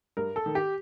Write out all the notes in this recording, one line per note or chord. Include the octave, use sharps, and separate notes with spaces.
G2 A#4
A4
D#3
G4